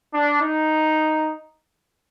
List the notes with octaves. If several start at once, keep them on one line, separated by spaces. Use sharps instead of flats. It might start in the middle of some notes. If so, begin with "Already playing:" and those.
D4
D#4